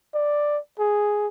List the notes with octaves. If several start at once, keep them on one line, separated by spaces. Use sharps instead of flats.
D5
G#4